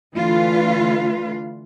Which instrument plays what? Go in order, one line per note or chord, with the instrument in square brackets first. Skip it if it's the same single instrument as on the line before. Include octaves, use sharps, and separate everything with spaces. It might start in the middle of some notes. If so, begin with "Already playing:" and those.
[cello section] D3 E3 A3 F4 B4 F5